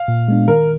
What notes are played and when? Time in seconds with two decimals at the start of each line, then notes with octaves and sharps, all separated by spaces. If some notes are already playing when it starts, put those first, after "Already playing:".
Already playing: F5
0.08 A#2
0.28 G#3 B3 D4
0.48 D#3 A#4